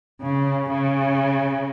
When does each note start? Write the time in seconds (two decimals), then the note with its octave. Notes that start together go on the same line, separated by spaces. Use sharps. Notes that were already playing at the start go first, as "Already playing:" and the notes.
0.22 C#3
0.70 C#3